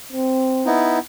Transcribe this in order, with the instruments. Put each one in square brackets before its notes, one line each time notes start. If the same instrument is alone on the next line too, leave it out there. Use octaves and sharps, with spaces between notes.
[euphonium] C4
[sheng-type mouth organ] B3 D#4 E4